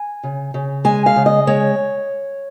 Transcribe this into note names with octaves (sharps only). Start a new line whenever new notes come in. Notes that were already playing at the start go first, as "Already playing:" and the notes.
Already playing: G#5
C#3
C#3
G#3 G#5
F5
C#3
D#5
G#3 C#5